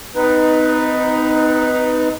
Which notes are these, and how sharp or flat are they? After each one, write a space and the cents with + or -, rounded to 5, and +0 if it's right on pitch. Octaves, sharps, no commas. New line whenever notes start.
C4 -45 D#4 +0 B4 +0